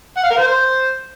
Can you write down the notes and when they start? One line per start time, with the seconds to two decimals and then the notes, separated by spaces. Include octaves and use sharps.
0.17 F#5
0.24 F5
0.30 A#4
0.37 C5